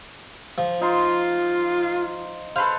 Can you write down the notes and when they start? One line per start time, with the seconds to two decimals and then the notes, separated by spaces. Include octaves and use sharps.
0.58 F3
0.81 D#4 F4 C6
2.56 A4 B4 C5 F5